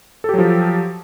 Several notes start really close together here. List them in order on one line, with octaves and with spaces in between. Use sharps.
A4 G4 F#3 F3